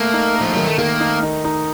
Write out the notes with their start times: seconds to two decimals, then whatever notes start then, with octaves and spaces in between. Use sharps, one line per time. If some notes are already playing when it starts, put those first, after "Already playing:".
Already playing: A3 A#3
0.13 D#4
0.36 A#4
0.41 F3
0.54 D#3 F#3
0.66 A3
0.78 D#3 A#3
1.00 D#4
1.23 D#4
1.44 D#4